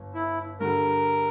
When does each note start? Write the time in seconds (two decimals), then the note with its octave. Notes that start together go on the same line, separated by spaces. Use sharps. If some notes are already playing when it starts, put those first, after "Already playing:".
Already playing: G1
0.15 E4
0.60 G2 D3 G3 A#4